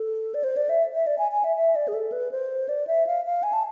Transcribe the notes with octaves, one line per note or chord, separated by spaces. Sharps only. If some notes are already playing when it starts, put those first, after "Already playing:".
Already playing: A4
D5
C5
D5
E5
E5
D5
G#5
G#5
E5
E5
D5
G#4
A4
B4
C5
D5
E5
F5
F5
G#5
A5